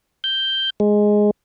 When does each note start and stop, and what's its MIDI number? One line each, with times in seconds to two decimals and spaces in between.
0.24 0.70 91
0.80 1.31 56